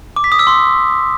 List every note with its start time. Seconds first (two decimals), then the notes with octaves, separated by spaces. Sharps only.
0.16 D6
0.24 B6
0.32 D#6
0.39 E6
0.47 C6